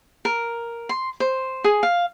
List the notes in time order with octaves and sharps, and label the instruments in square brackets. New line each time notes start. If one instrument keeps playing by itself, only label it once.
[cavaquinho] A#4
C6
C5
G#4
F5